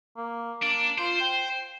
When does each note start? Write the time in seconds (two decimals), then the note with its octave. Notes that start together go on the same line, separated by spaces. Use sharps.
0.17 A#3
0.62 A#3 D4
0.98 F4 C5
1.21 G5